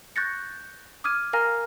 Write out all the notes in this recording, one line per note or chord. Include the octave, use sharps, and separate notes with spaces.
C#6 F#6 G6 A6 A#6 C#7
D6 D#6 F6 G#6 D#7
A#4 F5 G#5 A#5 F6 A#6